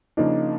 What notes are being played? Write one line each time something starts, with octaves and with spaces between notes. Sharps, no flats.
C#3 F3 A#3 D4 D#4